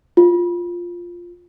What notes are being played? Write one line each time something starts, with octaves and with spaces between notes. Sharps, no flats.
F4